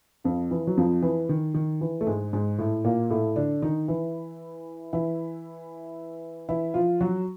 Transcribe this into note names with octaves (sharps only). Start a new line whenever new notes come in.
F2 F3
E3
F#3
F2 F3
E3
D#3
D#3
E3
A3
G#2 G#3
G#2 G#3
A2 A3
A#2 A#3
A2 A3
D3 D4
D#3 D#4
E3 E4
E3 E4
E3 E4
F3 F4
F#3 F#4